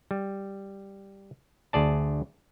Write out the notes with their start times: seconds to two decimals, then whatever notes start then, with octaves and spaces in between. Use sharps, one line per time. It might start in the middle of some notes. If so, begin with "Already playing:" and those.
0.11 G3
1.73 D2 G#4 D5 A5